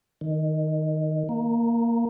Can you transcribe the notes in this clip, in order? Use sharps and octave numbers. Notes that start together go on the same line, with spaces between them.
D#3
A#3